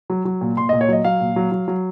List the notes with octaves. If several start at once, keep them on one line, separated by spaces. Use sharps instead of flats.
F#3
F#3
A#2
A#2 C6
D#5
A#2
C#5
F#3 D#5
F#3 F5
A#2
F#3
F#3
F#3